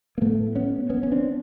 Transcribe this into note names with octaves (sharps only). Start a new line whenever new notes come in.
A#3
A2 A3 B3
B3 C#4
B3 C#4
C#4
C4 D4